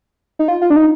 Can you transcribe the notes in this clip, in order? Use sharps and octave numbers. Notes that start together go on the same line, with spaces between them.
D#4
F4
F4
D4
D#4